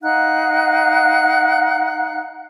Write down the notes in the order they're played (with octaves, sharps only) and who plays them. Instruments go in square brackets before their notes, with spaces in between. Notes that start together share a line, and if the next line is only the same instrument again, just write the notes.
[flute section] D#4 F5 F#5 F#6